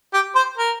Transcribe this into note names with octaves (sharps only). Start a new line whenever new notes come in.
G4
C5
A#4